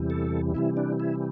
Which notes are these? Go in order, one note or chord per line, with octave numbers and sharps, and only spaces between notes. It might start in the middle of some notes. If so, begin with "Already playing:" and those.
Already playing: E2 C3 E3 G3
A4
C3 E3 G3 E4
D4
E4